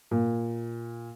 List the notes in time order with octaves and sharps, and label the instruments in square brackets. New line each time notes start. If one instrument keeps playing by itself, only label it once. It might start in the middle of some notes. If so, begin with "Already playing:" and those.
[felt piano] A#2